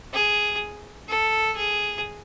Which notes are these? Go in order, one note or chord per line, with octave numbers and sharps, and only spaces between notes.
G#4
A4
G#4